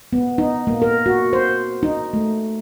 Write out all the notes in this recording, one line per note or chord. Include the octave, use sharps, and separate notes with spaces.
B3
D#4
A#3
A#4
F#4
C5
D#4
A3